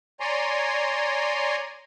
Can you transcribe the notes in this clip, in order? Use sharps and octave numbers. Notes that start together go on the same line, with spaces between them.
C#5 D5 G#5 A#5 C6